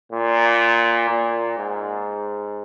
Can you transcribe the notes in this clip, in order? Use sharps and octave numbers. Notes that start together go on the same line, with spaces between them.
A#2
A#2
G#2